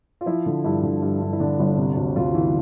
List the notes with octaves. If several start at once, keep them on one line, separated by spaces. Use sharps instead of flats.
F4
F3 E4
D3
G2 E4
D3
G2
G2
E4
D3 D4
G1
C3
D2
D2 F4
E3